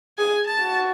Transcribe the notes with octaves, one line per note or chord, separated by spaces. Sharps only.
G#4 G#5
A5
F#4